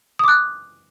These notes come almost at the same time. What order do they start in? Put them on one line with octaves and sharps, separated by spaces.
D#6 D6 F#6